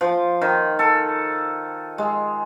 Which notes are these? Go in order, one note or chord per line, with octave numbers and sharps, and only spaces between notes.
F3
D#3
A4
G#3